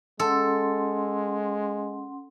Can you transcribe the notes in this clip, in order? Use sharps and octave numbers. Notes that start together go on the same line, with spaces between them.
G#3 C#4 A4 F#5 C6